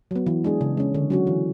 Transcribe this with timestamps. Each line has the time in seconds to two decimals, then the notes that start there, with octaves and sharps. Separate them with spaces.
0.11 F#3 B3
0.26 E3
0.44 G#3 D4 G#4
0.61 C#3
0.77 G#3 C#4
0.95 D3
1.10 F#3 C#4 F#4
1.27 E3